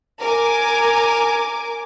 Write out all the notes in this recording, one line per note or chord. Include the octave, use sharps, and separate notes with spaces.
A#4 G#5 D6